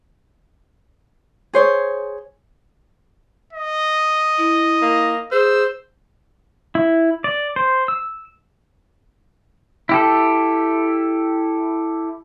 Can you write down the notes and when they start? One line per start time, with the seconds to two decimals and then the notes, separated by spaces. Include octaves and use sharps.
1.53 G#4 C5 C#5
3.53 D#5
4.38 E4
4.82 A#3
5.32 G#4 C5 E6
6.75 E4
7.24 D5
7.56 C5
7.88 E6
9.89 E4 G4 A4